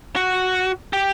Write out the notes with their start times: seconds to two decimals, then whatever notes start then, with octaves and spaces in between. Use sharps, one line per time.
0.16 F#4
0.93 G4